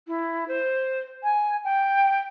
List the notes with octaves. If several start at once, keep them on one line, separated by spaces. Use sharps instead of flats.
E4
C5
G#5
G5